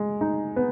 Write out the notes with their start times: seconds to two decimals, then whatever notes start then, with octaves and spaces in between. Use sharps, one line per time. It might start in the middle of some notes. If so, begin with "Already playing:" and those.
Already playing: G#3
0.21 D#4
0.56 B3